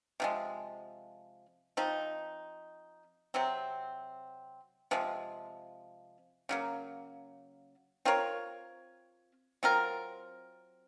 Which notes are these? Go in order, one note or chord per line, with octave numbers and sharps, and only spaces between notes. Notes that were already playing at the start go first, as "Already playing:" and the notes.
C3 F3 G#3
F3 C4 D#4
C3 F#3 C4
C3 F3 G#3
C#3 F#3 A#3
C4 F4 A#4 C#5
F#3 C4 F4 A#4